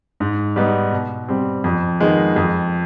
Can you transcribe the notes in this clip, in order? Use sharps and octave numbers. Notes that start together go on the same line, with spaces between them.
G#2
G3 B3 D#4
B2
G3 C4
F2
D#3 G#3 B3
F2